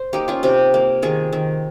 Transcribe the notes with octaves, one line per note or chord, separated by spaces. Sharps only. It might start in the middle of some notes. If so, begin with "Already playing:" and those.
Already playing: C5
A#3 D#4 G4
C#4 F4
C3 D#4 G4
A#3
D#3 F4 G#4
D#3